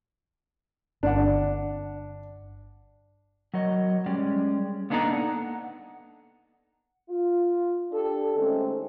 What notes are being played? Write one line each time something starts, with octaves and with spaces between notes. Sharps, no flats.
G1 D4 F#5
F#3 A#4 C#5 D#5
G3 G#3 C#4 D5
A#3 B3 D4 D#4 A4 A#5
F#5
F4
D4 G4 A4
D#3 G#3 A3 C4 C#4